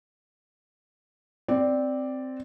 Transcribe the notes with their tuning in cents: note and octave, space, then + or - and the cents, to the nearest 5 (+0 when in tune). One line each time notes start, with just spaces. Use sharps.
C4 -5 D5 +0